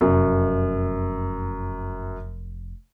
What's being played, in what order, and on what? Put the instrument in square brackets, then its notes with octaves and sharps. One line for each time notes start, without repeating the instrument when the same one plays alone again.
[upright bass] F1 C#4 [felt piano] F#2